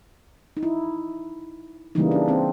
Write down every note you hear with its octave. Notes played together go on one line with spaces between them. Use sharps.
D#4
E4
C#3 E3 G3 A#3 D#4
D4
C4